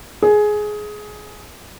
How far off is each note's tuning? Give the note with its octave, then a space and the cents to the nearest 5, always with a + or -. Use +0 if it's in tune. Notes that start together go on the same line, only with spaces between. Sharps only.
G#4 +15